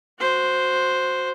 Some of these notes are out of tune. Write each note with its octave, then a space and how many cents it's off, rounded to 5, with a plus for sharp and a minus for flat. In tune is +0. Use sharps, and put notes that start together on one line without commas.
F#4 -15 C5 +0